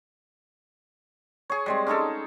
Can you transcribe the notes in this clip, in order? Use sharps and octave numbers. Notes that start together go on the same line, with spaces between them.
G#4 C#5
G3 G#3 C4
C#4 D#4 G#4 A4